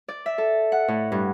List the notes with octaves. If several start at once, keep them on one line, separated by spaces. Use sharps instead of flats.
D5
E5
A4
F#5
A2
G2